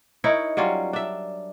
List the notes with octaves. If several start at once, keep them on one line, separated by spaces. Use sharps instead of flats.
D#4 E4 A#4 C#5
F#3 G3 C#4 F4
D4 E5